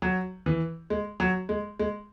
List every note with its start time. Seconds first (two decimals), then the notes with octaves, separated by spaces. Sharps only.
0.02 F#3
0.46 E3
0.90 G#3
1.20 F#3
1.49 G#3
1.79 G#3